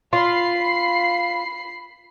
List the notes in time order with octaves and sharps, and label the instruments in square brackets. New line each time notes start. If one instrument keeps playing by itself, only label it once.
[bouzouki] F4 [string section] B5 C7